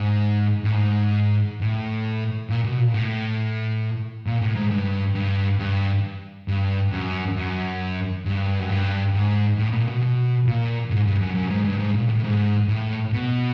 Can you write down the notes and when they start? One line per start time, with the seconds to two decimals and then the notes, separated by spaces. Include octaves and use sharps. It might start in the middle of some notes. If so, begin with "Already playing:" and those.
Already playing: G#2
0.64 A2
0.72 G#2
1.61 A2
2.49 A#2
2.64 B2
2.78 A#2
2.94 A2
4.26 A#2
4.41 A2
4.56 G#2
4.71 G2
5.15 G2
5.59 G2
6.48 G2
6.92 F#2
7.37 F#2
8.25 G2
8.59 F#2
8.69 G2
9.14 G#2
9.58 A2
9.73 A#2
9.88 B2
10.02 B2
10.47 A#2
10.91 G#2
11.06 G2
11.21 F#2
11.35 F#2
11.50 G#2
11.64 G2
11.79 G#2
11.94 A#2
12.09 A2
12.24 G#2
12.68 A2
13.12 B2